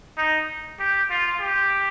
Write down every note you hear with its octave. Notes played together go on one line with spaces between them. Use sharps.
D#4
G4
F4
G4